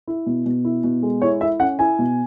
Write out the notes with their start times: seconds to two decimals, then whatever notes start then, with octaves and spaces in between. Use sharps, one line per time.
0.07 E4
0.26 B2
0.46 B2
0.65 E4
0.84 B2
1.03 G#3
1.22 E4 C#5
1.41 E4 E5
1.60 C#4 F#5
1.79 E4 G#5
1.99 B2